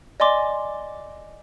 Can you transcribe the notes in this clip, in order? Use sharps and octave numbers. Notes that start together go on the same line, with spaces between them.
D5 D#5 G#5 C6 D6